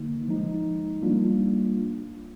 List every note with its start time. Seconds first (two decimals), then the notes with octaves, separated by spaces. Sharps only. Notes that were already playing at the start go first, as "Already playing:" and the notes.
Already playing: D3 A#3 D#4
0.28 F3 G#3 D#4
1.02 G3 A#3 D4 F4